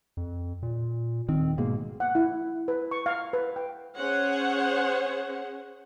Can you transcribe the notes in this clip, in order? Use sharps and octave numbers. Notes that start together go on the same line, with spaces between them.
F2
A#2
D#1 D#3 C4
G#2 B2 G#3 A#3
F#5
E4
B4
C#6
F5
B4
G5
C#4 G#4 C5 C#5 F#5